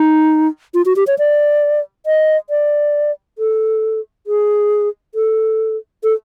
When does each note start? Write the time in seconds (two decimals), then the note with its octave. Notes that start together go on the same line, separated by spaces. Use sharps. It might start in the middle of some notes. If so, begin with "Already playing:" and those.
Already playing: D#4
0.74 F4
0.86 F#4
0.96 G4
1.07 C#5
1.19 D5
2.06 D#5
2.50 D5
3.38 A4
4.27 G#4
5.15 A4
6.03 A4